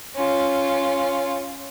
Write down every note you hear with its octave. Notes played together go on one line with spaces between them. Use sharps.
C#4 F4